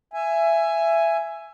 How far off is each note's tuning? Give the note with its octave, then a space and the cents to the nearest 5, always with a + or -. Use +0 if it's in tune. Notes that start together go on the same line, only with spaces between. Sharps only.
E5 +20 G#5 +0